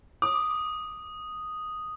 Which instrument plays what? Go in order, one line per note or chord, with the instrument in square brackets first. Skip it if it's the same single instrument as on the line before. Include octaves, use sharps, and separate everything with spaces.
[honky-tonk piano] D6 [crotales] D#6